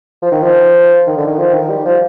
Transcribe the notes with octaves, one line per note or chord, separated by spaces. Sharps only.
F3
D#3
F3
D#3
D3
D#3
F3
D#3
G3
F3